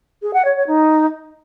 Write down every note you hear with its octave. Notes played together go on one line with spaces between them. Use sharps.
G#4
F#5
C#5
C#5
D#4